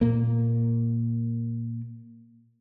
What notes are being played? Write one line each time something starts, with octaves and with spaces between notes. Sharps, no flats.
A#2 A#3